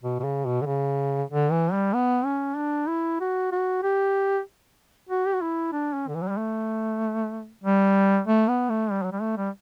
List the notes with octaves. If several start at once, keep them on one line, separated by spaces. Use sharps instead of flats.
B2
B2
C#3
B2
D3
C#3
D3
E3
G3
B3
C#4
D4
E4
F#4
F#4
G4
F#4
G4
F#4
E4
D4
C#4
D3
E3
F#3
G3
A3
G3
A3
B3
A3
G3
F#3
G3
A3
G3